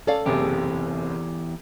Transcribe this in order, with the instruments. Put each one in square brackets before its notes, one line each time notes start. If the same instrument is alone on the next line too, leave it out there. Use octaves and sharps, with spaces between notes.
[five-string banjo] C#4 D5 F5 [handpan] A4
[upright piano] F#1 C3 G#4 [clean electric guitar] E2 G4